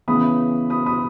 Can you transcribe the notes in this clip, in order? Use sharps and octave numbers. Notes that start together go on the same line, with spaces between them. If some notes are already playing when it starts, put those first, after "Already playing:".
C#3 E3 B3 B5 D#6
B5 D#6
B5 D#6